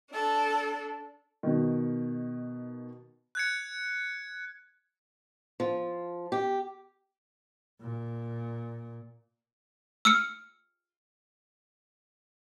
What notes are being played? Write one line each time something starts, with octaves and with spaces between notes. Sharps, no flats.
D4 A4
B2 D#3
F#6 G#6 C#7
F3
G4
A#2
E6 F6 C#7